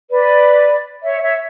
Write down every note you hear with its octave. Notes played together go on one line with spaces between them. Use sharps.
B4 D5
C#5 E5
C#5 E5